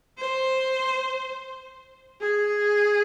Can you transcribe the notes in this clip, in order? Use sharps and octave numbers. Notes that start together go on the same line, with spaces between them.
C5
G#4